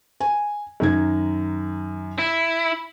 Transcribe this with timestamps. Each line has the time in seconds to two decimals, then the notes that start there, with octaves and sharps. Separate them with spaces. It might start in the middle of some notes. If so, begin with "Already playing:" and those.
0.21 G#5
0.80 F#2 D#3 G#6
2.19 E4